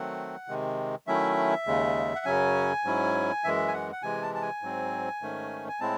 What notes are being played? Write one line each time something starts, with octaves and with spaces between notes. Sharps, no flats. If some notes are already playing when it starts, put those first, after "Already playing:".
Already playing: D#3 F#3 A3 C4 F#5
C3 D#3 G#3
D#3 F#3 A3 C#4 E4 E5
D#2 C#3 G#3
F#5
F#2 C#3 F#3 C#4 G#5
G#2 F#3 C#4 E4
F#2 E3 G#3 E5
G#5
F#5
F#5
C3 E3 G#3 G#5
A5
A5
G#5
G#2 F#3 C4
G#2 D#3 A3 C#4
G#5
A2 G#3 C4 E4 A5